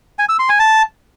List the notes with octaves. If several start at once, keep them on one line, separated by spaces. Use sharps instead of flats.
G#5
E6
C6
G#5
A5